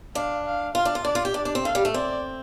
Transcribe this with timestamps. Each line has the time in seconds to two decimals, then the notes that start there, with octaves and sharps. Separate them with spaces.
0.15 D4 F5
0.45 F5
0.75 F4 F5
0.85 D4
0.95 F4
1.05 D4 D5
1.15 F4
1.25 G4
1.34 D4 D5
1.45 D4
1.55 C4
1.65 A3 F5
1.75 G3
1.85 A3
1.94 C4 D5